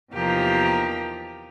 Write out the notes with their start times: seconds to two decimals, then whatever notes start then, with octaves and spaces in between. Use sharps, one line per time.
0.12 E2 C3 F3 A#3 D#4 G4